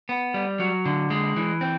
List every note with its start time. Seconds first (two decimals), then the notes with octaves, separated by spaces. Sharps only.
0.09 B3
0.34 G3
0.60 F#3
0.85 D3
1.10 G#3
1.36 E3
1.61 C4